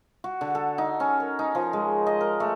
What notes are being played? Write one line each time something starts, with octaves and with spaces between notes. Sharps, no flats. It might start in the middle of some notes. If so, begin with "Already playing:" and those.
F#4
D3
A4
D#4
C#4
A#4
D#4
F3
G#3
D#5
A#4
A3